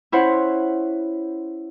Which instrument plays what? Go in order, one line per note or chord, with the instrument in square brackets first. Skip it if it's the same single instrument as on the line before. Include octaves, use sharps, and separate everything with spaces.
[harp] C#4 E4 C5 F#5